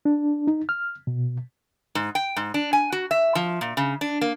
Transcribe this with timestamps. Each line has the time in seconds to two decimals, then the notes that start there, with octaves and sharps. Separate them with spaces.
0.05 D4
0.47 D#4
0.69 F6
1.07 B2
1.95 G#2
2.15 G5
2.37 G#2
2.54 D4
2.73 G#5
2.92 F#4
3.11 E5
3.35 F3
3.61 A#2
3.77 C#3
4.01 D4
4.21 A#3